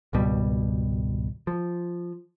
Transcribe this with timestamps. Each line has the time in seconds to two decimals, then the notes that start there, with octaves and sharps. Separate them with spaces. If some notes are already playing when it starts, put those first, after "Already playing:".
0.13 G#1 C#2 B2 G3
1.47 F3